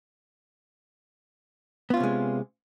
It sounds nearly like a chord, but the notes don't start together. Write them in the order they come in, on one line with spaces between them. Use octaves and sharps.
B3 F4 C#4 C3 G#3